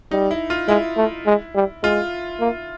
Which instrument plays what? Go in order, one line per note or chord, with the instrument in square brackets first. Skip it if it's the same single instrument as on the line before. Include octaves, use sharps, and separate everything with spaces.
[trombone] G3 [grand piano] D#4
[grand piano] E4
F4
[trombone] G#3 [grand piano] E4
[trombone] A3
G#3
G3
[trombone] G#3 [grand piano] F4
[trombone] A#3